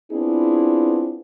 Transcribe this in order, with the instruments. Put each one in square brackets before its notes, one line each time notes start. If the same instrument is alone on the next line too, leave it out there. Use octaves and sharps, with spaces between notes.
[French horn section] B3 C4 D4 E4 F4 G#4